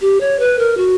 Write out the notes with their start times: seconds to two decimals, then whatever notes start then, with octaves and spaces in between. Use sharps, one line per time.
0.01 G4
0.20 C#5
0.39 B4
0.59 A#4
0.77 F#4